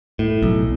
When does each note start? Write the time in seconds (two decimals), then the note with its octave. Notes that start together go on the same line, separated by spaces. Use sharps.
0.19 A2
0.42 B1